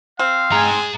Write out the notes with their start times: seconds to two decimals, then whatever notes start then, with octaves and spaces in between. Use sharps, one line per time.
0.19 C4 F5
0.52 G#3 G#4 G#5 A#5